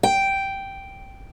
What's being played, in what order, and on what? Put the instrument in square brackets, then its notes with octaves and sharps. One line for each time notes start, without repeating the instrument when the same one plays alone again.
[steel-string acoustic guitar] G5